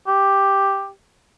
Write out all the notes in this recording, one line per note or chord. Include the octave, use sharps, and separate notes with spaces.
G4